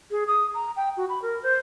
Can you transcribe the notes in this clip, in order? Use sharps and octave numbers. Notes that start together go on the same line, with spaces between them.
G#4
D#6
A#5
G5
F#4
B5
A#4
C5